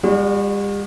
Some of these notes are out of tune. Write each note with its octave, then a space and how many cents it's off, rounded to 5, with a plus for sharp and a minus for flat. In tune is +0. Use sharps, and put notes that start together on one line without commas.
G3 +45 F#4 -25 D5 +0